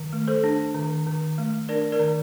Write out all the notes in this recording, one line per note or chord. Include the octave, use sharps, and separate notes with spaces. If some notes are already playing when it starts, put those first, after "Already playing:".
Already playing: D#3
A3
A4 C5
D4
D#3
D#3
A3
D4 A#4 D5
A#4 D5
D#3